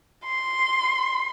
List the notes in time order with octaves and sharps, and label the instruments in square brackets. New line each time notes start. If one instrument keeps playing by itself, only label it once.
[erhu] C6